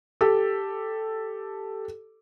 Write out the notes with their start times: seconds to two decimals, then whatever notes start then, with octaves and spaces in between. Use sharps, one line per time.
0.21 G4 A4